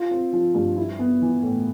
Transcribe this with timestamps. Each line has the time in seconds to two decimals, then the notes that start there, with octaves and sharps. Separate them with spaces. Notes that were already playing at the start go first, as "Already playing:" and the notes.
Already playing: F4
0.11 C4
0.33 F3
0.55 G2
0.77 E4
0.99 B3
1.22 E3
1.43 A2